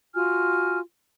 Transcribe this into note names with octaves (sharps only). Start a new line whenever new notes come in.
F4 F#4 G#5 F6